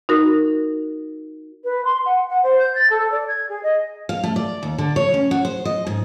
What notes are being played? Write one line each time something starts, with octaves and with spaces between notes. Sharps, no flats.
D#4 F#4 A#4
B4
C6
F#5
F#5
C5
G6
A6
A4
D5
G#6
G#4
D#5
F5
A3
D5
D#2
D3
C#5
C#4
F#4
C5
D#5
G#2